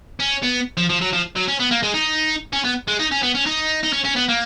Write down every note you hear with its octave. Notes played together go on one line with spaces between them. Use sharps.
C#4
B3
F3
F3
F#3
F3
F#3
C#4
B3
A#3
G#3
D#4
C#4
B3
G#3
D#4
C#4
B3
C#4
D#4
D#4
C#4
C#4
B3
A#3